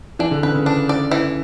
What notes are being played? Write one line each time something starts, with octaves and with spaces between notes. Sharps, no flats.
E3 D4
D3
C#3 B4
C#3
D4
D5
E3